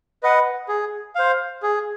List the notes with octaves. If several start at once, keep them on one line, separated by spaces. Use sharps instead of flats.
B4 D#5 F#5
G#4
C5 F5
G#4